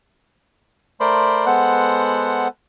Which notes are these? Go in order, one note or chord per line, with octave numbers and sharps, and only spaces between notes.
A3 A#4 C5 D5 B5 C6
G#3 B3 A4 C5 F#5 F#6